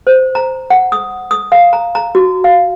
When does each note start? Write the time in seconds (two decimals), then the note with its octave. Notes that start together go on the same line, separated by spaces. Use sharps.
0.07 C5
0.35 A#5
0.70 F#5
0.92 D#6
1.31 D#6
1.52 F5
1.73 A#5
1.95 A#5
2.15 F#4
2.44 F5